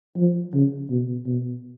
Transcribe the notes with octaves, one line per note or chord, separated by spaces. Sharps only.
F3
C#3
B2
B2